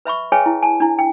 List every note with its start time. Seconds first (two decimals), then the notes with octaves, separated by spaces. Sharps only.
0.05 B4 E5 B5 C#6
0.32 G#4 B4 C#5 E5 G5 G#5
0.46 E4
0.63 G#5 A5
0.80 D4 E4
0.99 G5